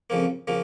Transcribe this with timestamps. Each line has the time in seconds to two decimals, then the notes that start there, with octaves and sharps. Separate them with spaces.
0.10 F2 C#3 F3 A#3
0.47 C#3 F3 A#3